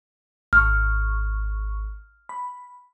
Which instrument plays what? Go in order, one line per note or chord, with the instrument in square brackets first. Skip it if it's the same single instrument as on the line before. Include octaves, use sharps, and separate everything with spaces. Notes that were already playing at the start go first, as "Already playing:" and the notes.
[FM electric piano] G#1 C#6 [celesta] F6
[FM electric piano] B5